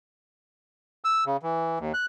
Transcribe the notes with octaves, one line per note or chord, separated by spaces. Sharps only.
E6
C#3
E3
D#2
F#6